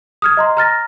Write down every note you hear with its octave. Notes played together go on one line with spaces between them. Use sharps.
D#6 F6 G#6
D#5 A#5 C6
A#5 F6 A6 A#6